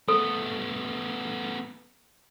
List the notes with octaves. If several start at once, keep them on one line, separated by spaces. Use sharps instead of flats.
A3 B3 A4